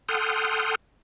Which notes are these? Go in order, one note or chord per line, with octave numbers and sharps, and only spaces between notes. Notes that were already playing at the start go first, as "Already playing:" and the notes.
A4 F#5 G5 C6 D#6 F6